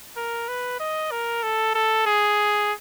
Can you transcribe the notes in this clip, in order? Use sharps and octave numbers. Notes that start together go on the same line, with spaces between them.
A#4
B4
D#5
A#4
A4
A4
G#4